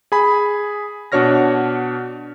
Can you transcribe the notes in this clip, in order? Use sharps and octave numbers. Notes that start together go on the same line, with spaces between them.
G#4 G#5 B5
B2 D4 F#4 C#5 F6 A#6